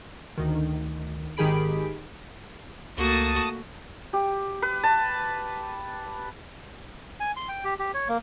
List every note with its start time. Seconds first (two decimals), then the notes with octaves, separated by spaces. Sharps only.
0.38 D2 D#3
1.37 G#1 D#3 G4 G#4 B5 D7
2.98 C#2 A3 A#3 F#4 A5 D#6
4.13 G4
4.62 B4
4.83 A5
7.20 G#5
7.37 C6
7.49 G5
7.64 G4
7.79 G4
7.94 C#5
8.08 A#3